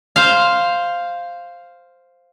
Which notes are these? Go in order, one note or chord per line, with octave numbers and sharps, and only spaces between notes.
C5 F5